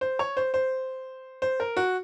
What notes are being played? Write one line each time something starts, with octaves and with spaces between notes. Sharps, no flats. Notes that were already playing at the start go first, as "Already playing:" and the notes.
C5
C#5
C5
C5
C5
A#4
F#4